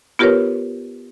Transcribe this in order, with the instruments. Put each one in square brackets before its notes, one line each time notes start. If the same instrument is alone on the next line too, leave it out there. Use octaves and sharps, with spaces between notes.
[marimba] B3 F4 G4 A#4 B4 C#5